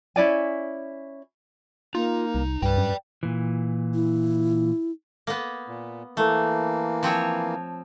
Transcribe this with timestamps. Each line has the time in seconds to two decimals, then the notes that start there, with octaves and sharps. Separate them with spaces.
0.16 C#4 E4 D5 G#5
1.95 A#3 D#4 F4
2.35 C2
2.62 C2 G2 B4 D5 G5
2.78 F#2
3.23 A#2 E3
3.95 E4
5.27 A#3 B3
5.68 A#2
6.17 E3 A3 A#3
7.03 F3 C4 C#5